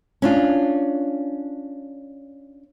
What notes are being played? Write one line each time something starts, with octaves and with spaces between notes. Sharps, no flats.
C#4 D4 F4